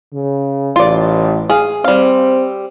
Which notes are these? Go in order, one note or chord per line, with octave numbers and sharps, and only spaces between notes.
C#3
A1 F4 D5
G#4 F5
G3 C4 F5